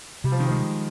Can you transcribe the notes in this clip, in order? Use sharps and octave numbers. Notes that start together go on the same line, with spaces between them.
C3 G3
F3
D#3
F3 G#3